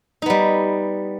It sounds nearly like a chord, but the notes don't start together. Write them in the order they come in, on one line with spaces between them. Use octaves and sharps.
D#4 B3 G3